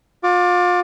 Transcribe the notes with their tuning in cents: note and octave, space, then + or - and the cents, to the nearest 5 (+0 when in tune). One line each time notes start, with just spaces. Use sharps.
F4 +35 D6 +0